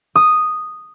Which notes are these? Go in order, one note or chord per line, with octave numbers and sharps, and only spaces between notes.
D#6